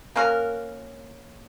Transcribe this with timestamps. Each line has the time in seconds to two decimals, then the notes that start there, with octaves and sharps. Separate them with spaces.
0.16 A#3 C#4 F#4 A#4